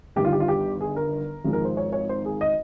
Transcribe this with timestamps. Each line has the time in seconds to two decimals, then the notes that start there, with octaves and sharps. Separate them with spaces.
0.16 G1 G2 D#3 G4
0.24 F4
0.32 G4
0.40 F4
0.48 G4
0.81 G#4
0.96 A#4
1.44 G#1 G#2 F3 G#3
1.53 A#4
1.65 C5
1.77 C#5
1.93 C#5
2.09 C5
2.25 G#4
2.41 D#5